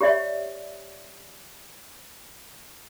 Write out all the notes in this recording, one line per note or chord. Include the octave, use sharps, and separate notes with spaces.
G4 C#5 D5 E5